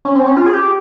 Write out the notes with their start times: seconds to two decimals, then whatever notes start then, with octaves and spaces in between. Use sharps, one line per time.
0.05 C#4
0.15 C4
0.26 C#4
0.37 F4
0.46 G#4
0.53 G4